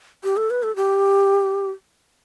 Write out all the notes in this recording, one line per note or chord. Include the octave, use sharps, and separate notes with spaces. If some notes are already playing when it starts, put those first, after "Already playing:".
G4
A4
B4
A4
G4